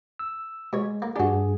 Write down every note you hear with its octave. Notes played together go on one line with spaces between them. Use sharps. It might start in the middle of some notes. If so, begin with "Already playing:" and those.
E6
B2 G#3 C#5
A#3
G2 D4 F#4 G#4